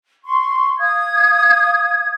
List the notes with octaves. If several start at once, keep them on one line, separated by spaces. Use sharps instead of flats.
C6 C#6
F5 D#6 G#6